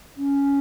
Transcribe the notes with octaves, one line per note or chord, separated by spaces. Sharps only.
C#4